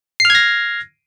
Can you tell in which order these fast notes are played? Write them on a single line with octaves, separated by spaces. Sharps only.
C7 F6 G#6 A#6